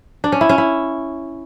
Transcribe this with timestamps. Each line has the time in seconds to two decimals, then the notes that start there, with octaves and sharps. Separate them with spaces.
0.24 D4
0.32 C#4
0.41 E4
0.49 C#4
0.58 E4